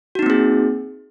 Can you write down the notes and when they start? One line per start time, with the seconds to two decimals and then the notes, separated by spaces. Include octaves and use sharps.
0.15 F#4
0.19 D#4
0.23 C4
0.26 A#3
0.30 G#4